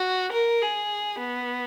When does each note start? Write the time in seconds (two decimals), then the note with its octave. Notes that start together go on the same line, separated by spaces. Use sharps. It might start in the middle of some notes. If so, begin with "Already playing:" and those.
Already playing: F#4
0.32 A#4
0.61 G#4
1.19 B3